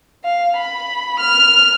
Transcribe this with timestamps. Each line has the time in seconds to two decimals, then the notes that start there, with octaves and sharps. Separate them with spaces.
0.25 F5
0.56 B5
1.19 F6